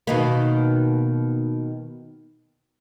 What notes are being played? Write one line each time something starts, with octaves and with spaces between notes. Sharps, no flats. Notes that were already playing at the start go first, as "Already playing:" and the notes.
B2 D#3 A#3